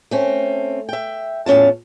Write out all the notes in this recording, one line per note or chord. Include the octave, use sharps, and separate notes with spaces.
A3 C4 C#4
E5 G5
E2 A2 C#4 F4 A5